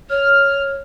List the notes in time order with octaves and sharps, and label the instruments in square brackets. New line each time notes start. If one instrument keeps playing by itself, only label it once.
[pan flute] C#5 [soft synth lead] F6